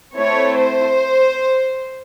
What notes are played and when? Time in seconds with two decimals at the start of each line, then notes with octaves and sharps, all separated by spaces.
0.15 A3 C4 E4 C#5
0.57 C5